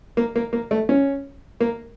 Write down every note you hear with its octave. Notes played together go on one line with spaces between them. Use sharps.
A#3
A#3
A#3
A3
C#4
A#3